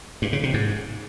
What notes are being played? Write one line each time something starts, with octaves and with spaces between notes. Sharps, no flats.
G2
C#3
C3
G#2